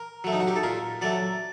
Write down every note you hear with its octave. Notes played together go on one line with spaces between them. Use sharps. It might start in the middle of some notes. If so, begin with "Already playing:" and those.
Already playing: A#4
F#3 A3
D#4
F#4
G4
A4
A#2 A#4
F#3 A3 D5